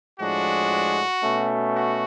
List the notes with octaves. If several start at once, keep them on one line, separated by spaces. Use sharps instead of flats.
A2 F3 G#3 D4 F#4
B2 A3 C#4
F#4